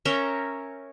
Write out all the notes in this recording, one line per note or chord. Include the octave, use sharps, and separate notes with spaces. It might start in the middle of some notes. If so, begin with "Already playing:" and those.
C#4 A#4 E5 G5